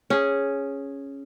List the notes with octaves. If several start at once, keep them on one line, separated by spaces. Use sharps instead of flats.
C#4 G#4